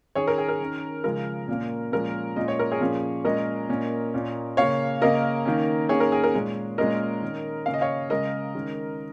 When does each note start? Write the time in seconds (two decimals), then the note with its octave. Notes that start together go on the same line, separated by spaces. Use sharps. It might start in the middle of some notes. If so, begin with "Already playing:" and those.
0.15 D#3 C#4 G#4 C#5
0.27 A#4
0.38 G#4
0.48 A#4
0.60 D#3 C#4
1.04 C#3 F3 G#3 C#4 A#4
1.48 A#2 A#3 C#4
1.92 A#2 F3 G#3 C#4 A#4
2.36 A#2 G#3 C#4 D#5
2.48 C#5
2.59 A#4
2.72 G#4 C#5
2.80 A#2 F3 A#3 C#4
3.25 A#2 G#3 C#4 A#4 D#5
3.69 A#2 A#3 C#4
4.14 A#2 A#3 C#4
4.57 C#3 A#3 C#4 C#5 F5
5.02 C#3 A#3 C#4 A#4 D#5
5.45 D#3 A#3 C#4
5.89 D#3 A#3 C#4 G#4 C#5
6.00 A#4
6.12 G#4
6.23 A#4
6.34 A#2 G#3 C#4
6.78 A#2 G#3 C#4 A#4 D#5
7.22 D#3 C#4
7.66 C#3 A#3 C#4 F5
7.74 D#5
7.81 C#5 F5
8.10 C#3 G#3 C#4 A#4 D#5
8.55 D#3 G#3 C#4